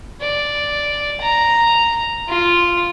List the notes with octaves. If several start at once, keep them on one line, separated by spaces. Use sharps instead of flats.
D5
A#5
F4